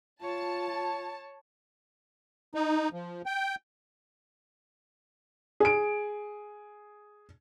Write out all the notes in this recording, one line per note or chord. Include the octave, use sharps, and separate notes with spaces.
F4 C#5 A5
D#4
F3
G5
G#4 D7